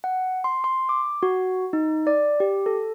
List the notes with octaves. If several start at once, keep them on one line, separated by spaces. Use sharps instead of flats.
F#5
C6
C6
D6
F#4
D#4
D5
G4
A4